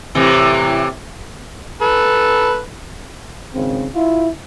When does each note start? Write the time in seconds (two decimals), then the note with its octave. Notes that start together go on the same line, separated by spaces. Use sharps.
0.15 A2 C3 E3
1.81 A4 B4
3.54 G#1 C#3 C4
3.95 E4 F4